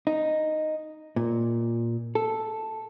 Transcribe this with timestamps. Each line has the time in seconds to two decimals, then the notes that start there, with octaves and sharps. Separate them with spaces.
0.07 D#4
1.16 A#2
2.15 A4